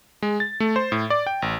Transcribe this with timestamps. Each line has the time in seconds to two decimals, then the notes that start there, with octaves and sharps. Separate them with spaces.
0.22 G#3
0.40 A6
0.60 A3
0.76 C5
0.92 A2
1.10 D5
1.27 G5
1.42 A1